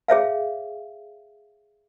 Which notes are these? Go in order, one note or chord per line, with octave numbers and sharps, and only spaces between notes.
G#4 C#5 E5 F5